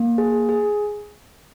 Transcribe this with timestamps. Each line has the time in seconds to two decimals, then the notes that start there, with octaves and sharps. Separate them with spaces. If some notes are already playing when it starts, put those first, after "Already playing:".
Already playing: A#3
0.18 G#4
0.49 G#4